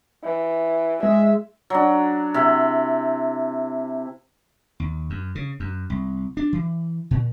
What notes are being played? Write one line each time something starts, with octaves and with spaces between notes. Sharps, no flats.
E3
G#3 E5
F#3 D4
C3 E4
D#2
F#2
C#3
F#2
C2
D4
E3
A#2